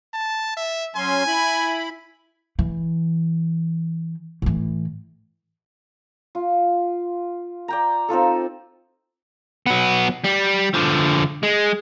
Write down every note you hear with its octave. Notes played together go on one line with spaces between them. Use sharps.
A5
E5
F#3 C#4 G#5 C6
E4 B5
E3
A2 E3
F4
D5 G5 A#5
C4 D#4 F4 A4
F#3 B3
G3
D3 F3
G#3